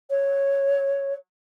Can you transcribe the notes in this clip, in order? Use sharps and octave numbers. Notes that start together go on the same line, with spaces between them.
C#5